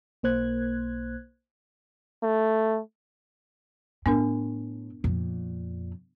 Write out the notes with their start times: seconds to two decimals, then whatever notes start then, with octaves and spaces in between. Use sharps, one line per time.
0.23 B1 A#3 C5 F#6 G#6
2.23 A3
4.06 A2 B3 D4 A#4
5.04 F2 A#2